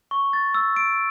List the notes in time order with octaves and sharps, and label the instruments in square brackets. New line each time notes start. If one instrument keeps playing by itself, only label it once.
[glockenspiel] C#6
A6
E6
D7